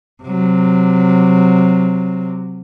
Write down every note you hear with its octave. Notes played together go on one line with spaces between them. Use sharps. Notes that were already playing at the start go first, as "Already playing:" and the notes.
C3 F#3